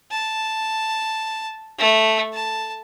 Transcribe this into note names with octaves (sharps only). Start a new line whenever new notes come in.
A5
A3
A5